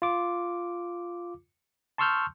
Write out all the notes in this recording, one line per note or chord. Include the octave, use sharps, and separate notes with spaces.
F4 D6
A5 C6 C#6 E6 F6 G6